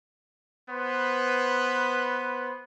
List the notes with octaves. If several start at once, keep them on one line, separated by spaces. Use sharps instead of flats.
B3 B4 C5